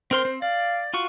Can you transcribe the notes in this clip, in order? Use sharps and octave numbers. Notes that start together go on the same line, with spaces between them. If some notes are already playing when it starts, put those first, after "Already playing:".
C4 A#4 C5 C6
C4
D5 F5
F4 F#4 C#6